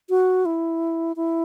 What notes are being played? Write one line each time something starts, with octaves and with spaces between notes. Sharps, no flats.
F#4
E4
E4